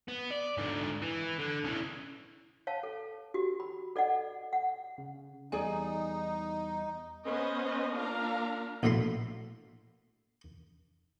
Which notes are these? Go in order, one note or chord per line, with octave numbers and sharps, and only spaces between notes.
B3
D5
G#2 D3
E3
D3
C#3 E3
C#5 F5 A5
A4
F#4 G4
B5
A4 D5 D#5 F#5
F#5
C#3
E2 G3 D#4 G#4 D5 G#5
B3 C#4 B4 C5 D#5
A#3 D4 F4 F5 A#5
A#1 A2 F#3 E5 B5 C6